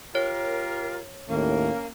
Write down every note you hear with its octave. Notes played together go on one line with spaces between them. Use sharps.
F4 G4 A#4 C#5
D#2 A2 A#3 C#4